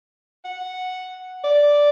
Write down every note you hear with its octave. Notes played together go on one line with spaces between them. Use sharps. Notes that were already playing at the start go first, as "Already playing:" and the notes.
F#5
D5